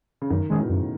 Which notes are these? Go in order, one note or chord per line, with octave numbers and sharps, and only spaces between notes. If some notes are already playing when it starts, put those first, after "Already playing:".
C#3
F#2 D#3
A2 D#3 G#3 C#4 G#4
B2
F#2 C#3